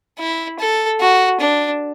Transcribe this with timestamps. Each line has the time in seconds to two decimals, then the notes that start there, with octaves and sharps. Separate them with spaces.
0.19 E4
0.59 A4
1.00 F#4
1.40 D4